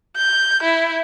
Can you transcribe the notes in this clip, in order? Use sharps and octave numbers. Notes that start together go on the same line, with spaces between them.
G6
E4